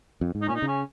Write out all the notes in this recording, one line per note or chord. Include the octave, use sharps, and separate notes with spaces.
F2
G#2
D#4
A#2 C#4
D#4
C#3
C#4